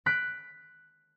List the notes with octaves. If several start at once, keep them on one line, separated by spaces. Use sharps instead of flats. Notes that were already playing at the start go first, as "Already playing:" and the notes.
F#6 B6 D7